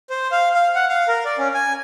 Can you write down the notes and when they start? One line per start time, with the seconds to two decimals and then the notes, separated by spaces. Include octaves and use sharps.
0.10 C5
0.32 F5
0.54 F5
0.75 F#5
0.89 F5
1.08 A#4
1.25 D5
1.38 C#4
1.54 G#5